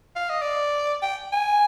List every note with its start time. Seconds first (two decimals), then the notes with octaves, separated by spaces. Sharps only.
0.15 F5
0.29 D#5
0.42 D5
1.02 G5
1.32 G#5